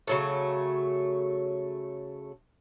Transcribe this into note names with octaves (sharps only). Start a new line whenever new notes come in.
C#3 F#3 A3